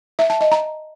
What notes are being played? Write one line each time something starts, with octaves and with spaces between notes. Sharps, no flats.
E5
A5
D#5
A#5